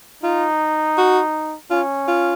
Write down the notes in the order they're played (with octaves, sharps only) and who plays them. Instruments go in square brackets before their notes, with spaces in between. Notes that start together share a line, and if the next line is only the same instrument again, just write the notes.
[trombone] D#4 [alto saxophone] F4
[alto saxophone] F#4
[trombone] C#4 [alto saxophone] F4
[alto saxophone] F4